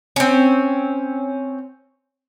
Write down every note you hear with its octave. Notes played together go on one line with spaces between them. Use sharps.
C4 C#4